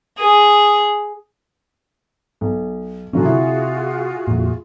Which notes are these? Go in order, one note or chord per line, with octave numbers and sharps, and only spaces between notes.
G#4
B1
B2 D3 F#3 C#4 D4 F4 F#4 G#4
C3 E4
F2 A#2